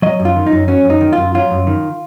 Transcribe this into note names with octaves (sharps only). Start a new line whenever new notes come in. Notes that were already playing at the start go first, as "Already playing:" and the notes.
F#3 D#5
F#2
F4
D#3
D#4
F#2
F#3 C#4
F#2 D#4
D#3
F#2 F4
F#3 F4
F#2
D#3